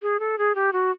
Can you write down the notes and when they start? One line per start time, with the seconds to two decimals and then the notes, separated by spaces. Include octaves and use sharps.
0.02 G#4
0.20 A4
0.38 G#4
0.55 G4
0.73 F#4